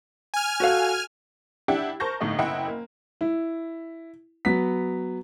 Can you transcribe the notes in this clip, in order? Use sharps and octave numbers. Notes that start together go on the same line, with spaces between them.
G#5 F6
F#4 A4 F5
D4 E4 G4 F#5 G5
A#4 C5 A5 C#6 G6 A#6
G1 A2 D#4 D#5
F#1 E4 D#5 F#5 G5 B5
A#3
E4
F#3 B3 B6